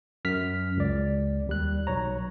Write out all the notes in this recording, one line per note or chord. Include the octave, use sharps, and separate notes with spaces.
F#2 F6 B6
C#2 D5
D#2 G3 F#6
B1 C#5 A#5